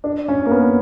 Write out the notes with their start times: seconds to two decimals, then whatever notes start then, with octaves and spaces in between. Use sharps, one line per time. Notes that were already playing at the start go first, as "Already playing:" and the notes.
0.04 D4
0.28 C#4
0.46 A#3
0.51 B3